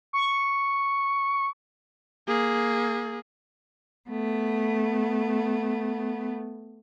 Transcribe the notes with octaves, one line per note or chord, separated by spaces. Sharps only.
C#6
A#3 G#4
A3 B3